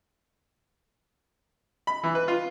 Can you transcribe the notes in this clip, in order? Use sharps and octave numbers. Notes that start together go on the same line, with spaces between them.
B5
E3
B4
F4